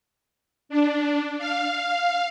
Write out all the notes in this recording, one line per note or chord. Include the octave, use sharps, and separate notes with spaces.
D4
F5